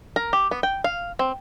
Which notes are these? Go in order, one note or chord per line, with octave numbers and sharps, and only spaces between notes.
A#4
G4
B3
G5
F5
C4